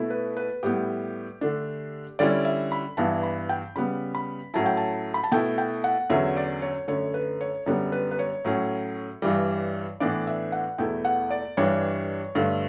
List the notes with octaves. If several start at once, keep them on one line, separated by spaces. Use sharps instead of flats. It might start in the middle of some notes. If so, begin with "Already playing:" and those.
Already playing: B2 A3 E4
B4
B4
A2 G3 B3 E4 G4
D3 A3 D4
D3 G3 C#4 E4 D5
E5
B5
G2 E3 B3 E4 A5
B5
G5
C#3 G3 B3 B5
B5
A2 F#3 C#4 E4 A5
G5
A5
B5
A5
B2 A3 E4 G5
G5
F#5
E2 D3 F#3 C#4 E5
D5
C#5
F#2 D3 A3 C#5
B4
C#5
F#2 D3 G3 B3 C#5
B4
B4
C#5
A2 F#3 C#4
G2 E3 G3
A2 E3 B3 D4 D5
E5
F#5
E2 B2 A3 E4 G5
F#5
D5
G2 E3 G3 D4 C#5
G2 D3 A3